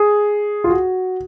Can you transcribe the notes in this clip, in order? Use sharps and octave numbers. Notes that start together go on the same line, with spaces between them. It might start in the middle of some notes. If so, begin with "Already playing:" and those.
Already playing: G#4
F4
F#4